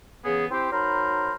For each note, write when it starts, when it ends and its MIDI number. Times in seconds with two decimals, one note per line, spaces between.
0.25 0.46 49
0.25 0.46 52
0.25 0.46 59
0.25 0.46 68
0.51 0.71 60
0.51 0.71 64
0.51 0.71 67
0.51 0.71 72
0.72 1.34 54
0.72 1.34 63
0.72 1.34 70
0.72 1.34 72
0.72 1.34 83